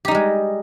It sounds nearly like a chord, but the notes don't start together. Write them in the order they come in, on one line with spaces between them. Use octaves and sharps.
G4 D#4 G3 G#3